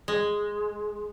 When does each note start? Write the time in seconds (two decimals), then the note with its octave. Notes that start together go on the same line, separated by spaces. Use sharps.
0.08 G#3